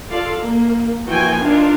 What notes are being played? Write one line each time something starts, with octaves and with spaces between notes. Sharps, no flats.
F4 A4 D5 F5
A#3
E3 F3 A#3 F#4 G5 G#5
D4 D#4 F4 A#4